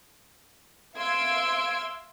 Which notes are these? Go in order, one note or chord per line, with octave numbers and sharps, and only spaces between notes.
E5 F5 C6 E6 G#6 D7